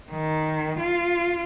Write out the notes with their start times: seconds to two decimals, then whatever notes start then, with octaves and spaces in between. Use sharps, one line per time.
0.11 D#3
0.79 F4